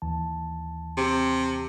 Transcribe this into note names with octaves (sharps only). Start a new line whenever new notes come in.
D#2 E3 A5
C3